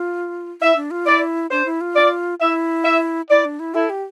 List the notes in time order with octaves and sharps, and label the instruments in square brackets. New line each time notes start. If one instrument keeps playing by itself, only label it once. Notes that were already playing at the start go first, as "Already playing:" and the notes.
Already playing: [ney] F4
[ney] E4 [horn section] E5
[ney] D4
F4
[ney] E4 [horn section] D5
[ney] D4 [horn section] C5
[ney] E4
F4
[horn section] D5
[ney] E4 [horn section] E5
[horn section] E5
[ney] E4 [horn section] D5
[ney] D4
E4
[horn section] E4 [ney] A4
[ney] G4